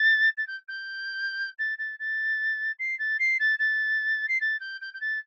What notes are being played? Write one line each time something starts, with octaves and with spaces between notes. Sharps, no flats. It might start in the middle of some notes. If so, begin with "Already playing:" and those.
Already playing: A6
A6
G6
G6
A6
A6
A6
C7
A6
C7
A6
A6
C7
A6
G6
G6
G6
A6